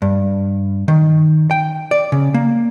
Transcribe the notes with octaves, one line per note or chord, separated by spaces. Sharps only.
G2
D#3
G5
D5
C#3
A#3